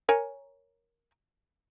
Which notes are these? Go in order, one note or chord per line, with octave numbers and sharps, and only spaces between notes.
A#4 C#5 G#5